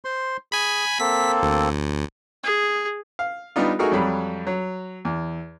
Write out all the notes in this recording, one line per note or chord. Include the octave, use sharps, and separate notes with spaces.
C5 C6
G#4 G#5 B5
A#3 C4 A4 B6
D2
G#4
F5
G3 B3 D4 D#4 F4
A3 D#4 F#4 G#4 A#4
F2 F#3 G3 B5
F#3
E2